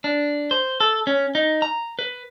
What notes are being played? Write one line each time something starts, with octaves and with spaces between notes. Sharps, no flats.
D4
C5
A4
C#4
D#4
A#5
B4